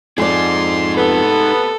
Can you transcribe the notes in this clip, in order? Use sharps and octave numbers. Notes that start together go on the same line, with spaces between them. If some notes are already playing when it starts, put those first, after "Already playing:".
F2 D#4 G#4 D5 C6
C3 A3 B3 A4